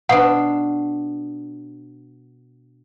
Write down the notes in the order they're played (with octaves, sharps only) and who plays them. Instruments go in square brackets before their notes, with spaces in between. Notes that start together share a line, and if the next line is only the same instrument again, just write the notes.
[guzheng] B2 D4 [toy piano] F#5